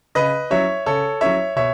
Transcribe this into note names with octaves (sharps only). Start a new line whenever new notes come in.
C#3 B4 D#5
F#3 C#4 E4 C#5 E5
C#3 A4 C#5
F#3 C#4 E4 C#5 E5
B2 C#5 E5